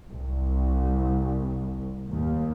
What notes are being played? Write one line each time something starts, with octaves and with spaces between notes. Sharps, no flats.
C2
D#2